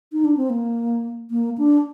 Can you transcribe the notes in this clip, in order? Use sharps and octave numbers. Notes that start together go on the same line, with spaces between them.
D#4
D4
C4
A#3
A#3
D4